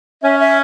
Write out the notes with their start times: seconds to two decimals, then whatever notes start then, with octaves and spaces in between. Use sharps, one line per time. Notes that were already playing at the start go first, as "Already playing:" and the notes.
0.22 C#4 E5
0.39 E5